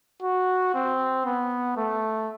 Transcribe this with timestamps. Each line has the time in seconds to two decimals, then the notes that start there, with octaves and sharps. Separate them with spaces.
0.22 F#4
0.74 C4
1.26 B3
1.77 A3